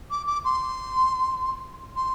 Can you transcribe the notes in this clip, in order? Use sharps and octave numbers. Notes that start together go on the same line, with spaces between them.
D6
D6
C6
C6